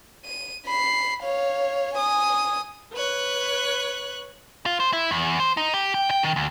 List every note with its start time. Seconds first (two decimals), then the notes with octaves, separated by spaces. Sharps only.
0.25 D#7
0.66 B5 C7
1.23 C#5 F5
1.94 G#5 D#6
2.93 B4 C#5 F#6
4.66 F4
4.80 C5
4.93 E4
5.11 E2
5.40 C5
5.57 D#4
5.74 G4
5.94 G5
6.10 G5
6.23 D#3
6.36 D2